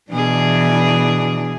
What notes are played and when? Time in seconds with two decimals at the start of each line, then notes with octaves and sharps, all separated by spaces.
0.11 B2 E3 D4 G#4